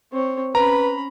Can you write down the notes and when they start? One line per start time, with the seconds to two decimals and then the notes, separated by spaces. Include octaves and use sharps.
0.13 C4 C#5
0.55 C#4 B4 A#5 B5